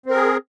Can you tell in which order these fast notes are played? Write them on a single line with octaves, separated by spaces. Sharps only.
C4 A#4 G#4